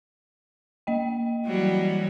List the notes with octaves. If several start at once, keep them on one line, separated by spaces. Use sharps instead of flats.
A#3 D#5 G5
E3 F#3 G3